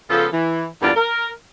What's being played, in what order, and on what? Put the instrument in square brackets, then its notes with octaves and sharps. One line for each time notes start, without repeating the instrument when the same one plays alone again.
[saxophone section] C#3 F3 B3 F4 A4
E3
E2 G2 A#2 D3 F4 D5
A#4